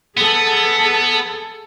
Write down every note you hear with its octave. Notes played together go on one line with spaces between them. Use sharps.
B3 G#4 A4